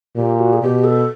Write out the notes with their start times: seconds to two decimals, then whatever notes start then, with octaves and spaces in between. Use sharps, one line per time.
0.16 A#2 G4
0.39 F#4
0.53 G#4
0.62 B2 G4
0.84 A4